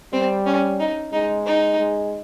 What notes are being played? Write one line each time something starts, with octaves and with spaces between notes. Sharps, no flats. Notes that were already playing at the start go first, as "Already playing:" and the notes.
G3 C4
C#4
D#4
G#3 D#4
D#4
G#3